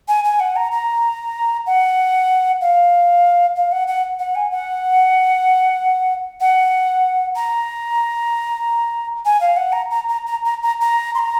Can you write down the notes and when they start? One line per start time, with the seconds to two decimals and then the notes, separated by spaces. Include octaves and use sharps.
0.08 G#5
0.24 G#5
0.40 F#5
0.56 A#5
0.72 A#5
1.67 F#5
2.61 F5
3.56 F5
3.72 F#5
3.88 F#5
4.19 F#5
4.35 G#5
4.51 F#5
6.40 F#5
7.36 A#5
9.25 G#5
9.41 F5
9.57 F#5
9.73 A#5
9.91 A#5
10.09 A#5
10.27 A#5
10.45 A#5
10.63 A#5
10.81 A#5
11.15 C6
11.19 A#5